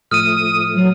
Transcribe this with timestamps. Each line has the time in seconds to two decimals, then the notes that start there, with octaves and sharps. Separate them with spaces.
0.11 A2 F3 A3 D#6 F6 D#7
0.75 F#3